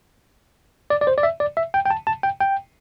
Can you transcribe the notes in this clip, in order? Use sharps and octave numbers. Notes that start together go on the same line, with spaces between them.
D5
D5
C5
D5
E5
D5
E5
G5
G5
A5
A5
G5
G5